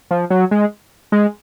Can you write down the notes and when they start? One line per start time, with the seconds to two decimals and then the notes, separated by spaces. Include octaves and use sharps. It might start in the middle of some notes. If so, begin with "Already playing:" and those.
0.11 F3
0.30 F#3
0.51 G#3
1.12 G#3